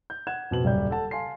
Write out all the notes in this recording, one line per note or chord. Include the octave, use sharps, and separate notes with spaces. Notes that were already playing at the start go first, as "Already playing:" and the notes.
G6
F#5 F#6 G#6 E7
F2 B2 F#7
D#1 F#2 C#3 G3 D5 G6
A4 F#5 A5
F5 G#5 A5 C6 C7